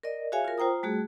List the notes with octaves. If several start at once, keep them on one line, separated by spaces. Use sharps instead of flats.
A#4 D5 D#5
F#4 G#4 C#5 E5 F5 G#5
F4 A#4
F4 C5 G5 A#5 D#6
G3 A3 F#4 G#4